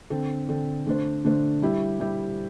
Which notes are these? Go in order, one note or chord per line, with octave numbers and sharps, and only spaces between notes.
D3 C4 A4
D3 C4 A4
D3 A3 D4 C5
D3 A3 D4 C5
G3 E4 G4 E5
G3 E4 G4 E5